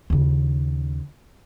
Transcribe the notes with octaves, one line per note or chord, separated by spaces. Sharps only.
D#2 C#3